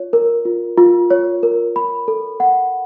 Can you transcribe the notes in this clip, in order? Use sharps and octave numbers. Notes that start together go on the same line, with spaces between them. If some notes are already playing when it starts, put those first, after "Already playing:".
Already playing: F4 C#5
A#4
F4
F4
C#5
A#4
B5
A4
F#5